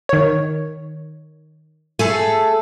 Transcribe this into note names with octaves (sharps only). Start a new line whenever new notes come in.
D#3 C#5
A3 G#4 A4